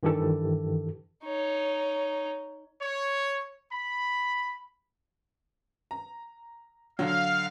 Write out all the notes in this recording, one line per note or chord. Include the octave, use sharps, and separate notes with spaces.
G2 D#3 E3 G4 A4
D#4 C#5
C#5
B5
A#5
D3 F#3 F5